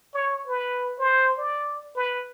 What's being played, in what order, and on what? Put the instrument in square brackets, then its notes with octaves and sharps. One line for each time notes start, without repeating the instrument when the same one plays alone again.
[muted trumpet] C#5
B4
C5
D5
B4